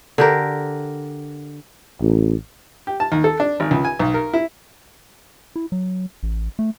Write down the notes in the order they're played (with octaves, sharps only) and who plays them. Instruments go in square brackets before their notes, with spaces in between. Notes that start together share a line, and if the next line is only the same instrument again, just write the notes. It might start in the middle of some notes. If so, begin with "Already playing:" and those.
[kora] D3 G4 A#4
[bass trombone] A1
[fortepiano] G4
A5
D#2
A4
D4
G#1
C#2
G#5
B1
A#4
E4
[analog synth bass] E4
F#3
A1
A3